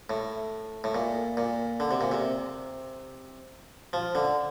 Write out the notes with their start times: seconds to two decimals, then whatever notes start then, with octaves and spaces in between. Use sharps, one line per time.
0.10 A2
0.84 A2
0.95 A#2
1.37 A#2
1.80 D3
1.91 C3
2.01 A#2
2.12 C3
3.93 F3
4.15 D3